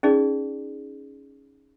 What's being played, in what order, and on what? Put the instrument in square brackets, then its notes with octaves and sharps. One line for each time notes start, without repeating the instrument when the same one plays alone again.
[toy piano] C#4 D#4 G#4 D5